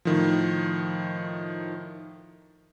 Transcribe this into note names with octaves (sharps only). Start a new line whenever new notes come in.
A2 D#3 F3